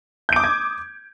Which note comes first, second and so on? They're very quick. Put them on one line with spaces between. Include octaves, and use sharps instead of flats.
G6 D7 D6 D#6 G#6